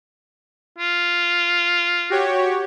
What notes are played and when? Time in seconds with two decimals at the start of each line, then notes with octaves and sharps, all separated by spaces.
0.78 F4
2.10 F#4 G4 C#5